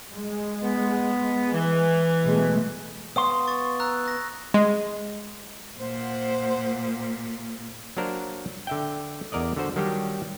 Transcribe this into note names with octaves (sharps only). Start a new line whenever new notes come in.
G#3
B3
E3
B2 G#3 A3
B3 F5 C6 D#6
C#6 A6
A#5 E6 F#6
A#6
G#3
A#2 C5 F#5
F#3 A#3 D4 A#4 C5
D3 E5 G5
E2 A#4 D5 D#5
D3 F#4 C5
D#3 F#3 G3 D4 D#4 G4